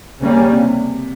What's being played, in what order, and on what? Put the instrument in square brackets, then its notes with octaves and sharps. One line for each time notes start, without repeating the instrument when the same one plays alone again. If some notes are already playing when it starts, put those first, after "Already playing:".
[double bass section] C#3 G3 A#3 C#4
[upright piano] C3
C3